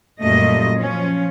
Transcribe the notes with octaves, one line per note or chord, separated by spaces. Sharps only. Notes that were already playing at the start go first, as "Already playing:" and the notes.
F#2 A#2 G3 A3 D#5
F3 C#4